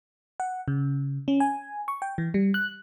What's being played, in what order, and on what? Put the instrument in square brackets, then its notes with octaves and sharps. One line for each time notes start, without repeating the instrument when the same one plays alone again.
[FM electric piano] F#5
C#3
C#4
G#5
C#6
G5
E3
G3
F#6